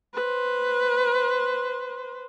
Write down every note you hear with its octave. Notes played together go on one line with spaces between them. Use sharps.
B4 C5